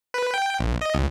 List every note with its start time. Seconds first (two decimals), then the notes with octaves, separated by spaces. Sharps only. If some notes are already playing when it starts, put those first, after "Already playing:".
0.14 B4
0.34 G5
0.59 A#1
0.81 D#5
0.95 C#2